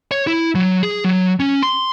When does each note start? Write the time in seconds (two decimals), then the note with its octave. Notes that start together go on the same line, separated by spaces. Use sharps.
0.11 C#5
0.27 E4
0.55 F#3
0.83 G#4
1.04 F#3
1.40 C#4
1.62 C6